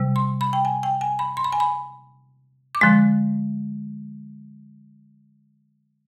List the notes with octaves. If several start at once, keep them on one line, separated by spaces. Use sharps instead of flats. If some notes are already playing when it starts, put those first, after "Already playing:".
Already playing: C3 G3
C6
B5
G5
G#5
G5
G#5
B5
C6
B5
G#5
B5
D6
D3 F3 G#3 C6